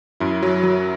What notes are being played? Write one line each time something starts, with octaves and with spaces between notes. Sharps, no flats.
F#2 E4
F#3
F#3